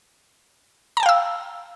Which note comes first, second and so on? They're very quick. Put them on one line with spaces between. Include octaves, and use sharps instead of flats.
A#5 A5 G5 F5 E6